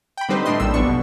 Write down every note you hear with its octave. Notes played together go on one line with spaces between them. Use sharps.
G5 B5
D3 G3 C4 D#4 B4 C5
A2 D4 D#5 C6
A#1 G3 E6
G1 F#2 B3 D4 C#6
B2